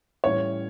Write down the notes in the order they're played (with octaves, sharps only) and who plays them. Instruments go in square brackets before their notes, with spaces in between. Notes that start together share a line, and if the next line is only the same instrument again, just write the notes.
[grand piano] A2 E3 G3 C#4 E4 [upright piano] C#5